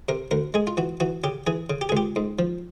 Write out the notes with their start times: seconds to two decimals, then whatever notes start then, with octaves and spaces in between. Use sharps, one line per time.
0.09 C3 A#4
0.31 D2 A#4
0.54 G#3 G#4
0.67 F4
0.77 E3 F#4
1.00 E3 F#4
1.24 C#3 G4
1.47 E3 G#4
1.70 C#3
1.81 G4
1.89 G#4
1.92 C#2 G4
2.16 G#2
2.39 F3